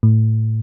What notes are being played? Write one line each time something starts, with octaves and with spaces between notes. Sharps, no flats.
A2